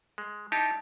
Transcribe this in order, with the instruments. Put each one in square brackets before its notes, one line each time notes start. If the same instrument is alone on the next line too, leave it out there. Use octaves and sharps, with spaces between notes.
[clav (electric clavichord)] G#3
[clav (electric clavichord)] D#4 E4 G4 [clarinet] A5